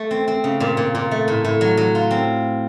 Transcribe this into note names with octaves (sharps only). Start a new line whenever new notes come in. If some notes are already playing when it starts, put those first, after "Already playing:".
Already playing: A3
C4
C4
C#3
A#2
A#2
A#2
A3
A2
A2
F#3
F#3
F4
C4